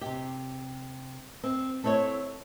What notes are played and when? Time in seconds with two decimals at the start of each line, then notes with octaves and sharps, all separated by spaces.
0.01 C3 G4
1.43 C4
1.83 A3 C4 E4 A4 C#5